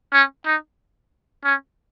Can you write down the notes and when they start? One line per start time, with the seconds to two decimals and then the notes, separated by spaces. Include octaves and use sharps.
0.12 C#4
0.46 D#4
1.44 C#4